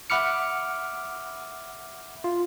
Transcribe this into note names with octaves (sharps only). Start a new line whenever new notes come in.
E5 F#5 B5 D6 F6 C#7
F4